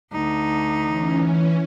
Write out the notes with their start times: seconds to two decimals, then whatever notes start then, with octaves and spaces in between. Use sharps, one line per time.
0.13 D2 D#4
0.83 E3 C#4